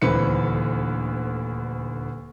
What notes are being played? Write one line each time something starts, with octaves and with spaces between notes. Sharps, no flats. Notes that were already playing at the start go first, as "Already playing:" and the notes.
D#1 D2 E3 C4 B4 C#7